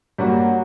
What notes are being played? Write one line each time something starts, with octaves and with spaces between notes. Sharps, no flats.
G2 F#3 A#3 F#4